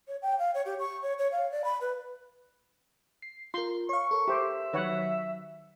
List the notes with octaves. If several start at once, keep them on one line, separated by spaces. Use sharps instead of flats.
C#5
G5
F5
C#5
G4
C#6
C#5
C#5
F5
D5
B5
B4
C7
F4 A#4 C6
C#5 F5 C#6
A4 A#4
G4 C5 E5
D#3 F#3 B4 C#5 F#5